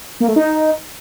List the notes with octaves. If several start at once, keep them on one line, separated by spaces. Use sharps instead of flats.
A#3
A3
D#4